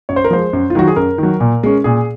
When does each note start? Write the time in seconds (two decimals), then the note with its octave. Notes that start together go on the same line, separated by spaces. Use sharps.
0.09 F#2 C#5
0.16 C5
0.24 A#4
0.31 F3 G#3 C5
0.53 F#2
0.70 F4
0.75 D#3 F#3 F#4
0.88 G#4
0.96 F#2 A#4
1.18 D#3 F#3
1.40 A#2
1.63 G#3 C#4
1.84 A#2 G#4